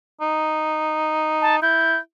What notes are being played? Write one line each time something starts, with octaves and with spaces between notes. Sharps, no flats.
D#4
A5
E4 G6